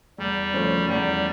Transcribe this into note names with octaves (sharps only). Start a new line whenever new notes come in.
E2 G3
C#3 F3 A3 C#4
E2 G3